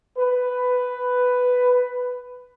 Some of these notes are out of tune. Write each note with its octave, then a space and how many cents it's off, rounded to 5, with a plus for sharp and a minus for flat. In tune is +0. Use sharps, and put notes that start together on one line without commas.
B4 +10